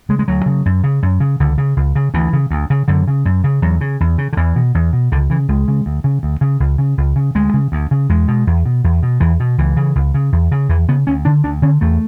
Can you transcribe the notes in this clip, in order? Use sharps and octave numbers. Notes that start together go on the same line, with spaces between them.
C#3 G#3
G#3
D2 F#3
C#3
F#2
C#3
F#2
C#3
C#2 D3
C#3
C#2
C#3
D2 E3
C#3
D2
C#3
F#2 D3
C#3
F#2
C#3
E2 F#3
C#3
E2
C#3
D3
E2 E3
B2
E2
B2
C#2 D3
C#3 E3
C#2 G#3
C#3
D2
C#3
D2
C#3
C#2
C#3
C#2
C#3
D2 G#3
C#3
D2
C#3
E2 G#3
B2
E2
B2
E2
B2
E2 E3
B2
C#2 E3
C#3
C#2
C#3
E2
C#3
E2 E3
C#3 B3
D2 C#4
D3 D4
D2 D4
D3 C#4
E2 A3